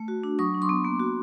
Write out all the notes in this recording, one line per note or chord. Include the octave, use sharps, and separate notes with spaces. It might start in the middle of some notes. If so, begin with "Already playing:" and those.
Already playing: A3
F#4
D4
F#3 C#6 D#6
D4
C6 D6
B3
A#3
F#4